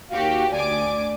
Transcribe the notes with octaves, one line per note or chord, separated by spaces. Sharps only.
D#2 F#4 G4 F5
D2 D5 G#5 D6